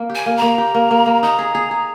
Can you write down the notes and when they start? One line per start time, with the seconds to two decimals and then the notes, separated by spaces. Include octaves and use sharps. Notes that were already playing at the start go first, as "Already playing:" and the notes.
Already playing: A#3
0.10 G4
0.15 G#5
0.26 A#3
0.37 A#5
0.42 A#3
0.58 G4
0.74 A#3
0.91 A#3
1.06 A#3
1.23 D#4 A#5
1.39 G#4
1.55 G#4
1.71 G#4